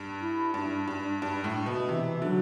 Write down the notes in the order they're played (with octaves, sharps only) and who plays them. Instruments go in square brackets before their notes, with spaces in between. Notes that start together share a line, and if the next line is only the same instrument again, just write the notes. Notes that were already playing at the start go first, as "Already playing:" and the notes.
Already playing: [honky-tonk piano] G2
[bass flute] E4
[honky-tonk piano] G2 [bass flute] D4
[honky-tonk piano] G2
G2
A2
B2
[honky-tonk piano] C3 [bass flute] E3
[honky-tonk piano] D3 [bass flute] F#3